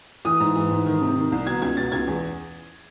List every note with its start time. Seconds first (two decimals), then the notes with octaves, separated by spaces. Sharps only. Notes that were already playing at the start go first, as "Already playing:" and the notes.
0.25 E3 D#6
0.40 G#2
0.55 E3
0.71 G#2
0.86 D#3
1.02 C3
1.16 D#3
1.32 C2
1.47 B2 G#6
1.62 C#2 G#6
1.77 B2 A6
1.92 C#2 G#6
2.07 E2